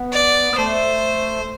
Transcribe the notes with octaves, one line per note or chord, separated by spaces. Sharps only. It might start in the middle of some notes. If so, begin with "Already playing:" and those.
Already playing: B3
D5
B3
A3 C5